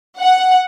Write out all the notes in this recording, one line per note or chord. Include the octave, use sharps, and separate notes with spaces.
F#5